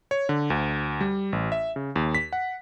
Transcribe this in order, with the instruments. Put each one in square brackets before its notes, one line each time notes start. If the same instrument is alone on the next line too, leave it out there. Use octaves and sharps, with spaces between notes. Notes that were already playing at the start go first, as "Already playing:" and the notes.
[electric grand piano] C#5
D3
D2
G3
A1
E5
C#3
D#2
B6
F#5